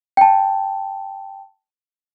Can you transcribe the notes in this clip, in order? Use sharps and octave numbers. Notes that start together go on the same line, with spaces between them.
G5 A5